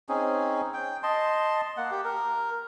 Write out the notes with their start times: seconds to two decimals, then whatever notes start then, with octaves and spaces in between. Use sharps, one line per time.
0.09 C4 C#4 D#4 G#4
0.74 G5
1.03 D#5 A5 C6
1.77 A#3 F#5
1.91 G4
2.05 A#4